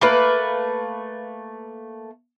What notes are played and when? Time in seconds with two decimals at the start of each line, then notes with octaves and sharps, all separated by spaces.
0.01 A3 A#3 B4